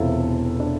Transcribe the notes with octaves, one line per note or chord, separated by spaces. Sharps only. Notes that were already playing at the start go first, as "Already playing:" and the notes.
Already playing: E1 E2 C3 E3 E4 F4 A4
D4